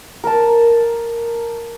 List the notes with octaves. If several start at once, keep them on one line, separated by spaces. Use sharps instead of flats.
A#4 A5